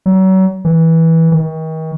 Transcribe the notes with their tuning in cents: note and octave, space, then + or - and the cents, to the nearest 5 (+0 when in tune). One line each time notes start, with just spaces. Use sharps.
F#3 +35
E3 -15
D#3 +40